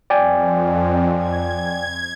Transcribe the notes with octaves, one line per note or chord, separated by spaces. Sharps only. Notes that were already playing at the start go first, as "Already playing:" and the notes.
F2 D5 G5 G#5
G#6